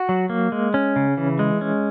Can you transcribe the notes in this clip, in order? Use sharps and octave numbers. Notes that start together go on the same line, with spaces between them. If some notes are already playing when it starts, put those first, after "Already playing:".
Already playing: F#4
F#3
A#3
G#3
C#4
C#3
E3
G#3
C#4